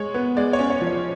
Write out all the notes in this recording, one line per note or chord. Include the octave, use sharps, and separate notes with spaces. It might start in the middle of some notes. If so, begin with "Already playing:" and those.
Already playing: G#3 C#5
B3
G#3 D5
C#5
C#4
C#5
F3
C#5